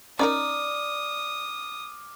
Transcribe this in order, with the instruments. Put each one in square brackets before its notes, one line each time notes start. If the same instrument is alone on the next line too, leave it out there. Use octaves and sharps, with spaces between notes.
[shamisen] C#4 D#4 A#4 [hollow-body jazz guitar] D5 A#5 [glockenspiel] D6 F6 [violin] D#6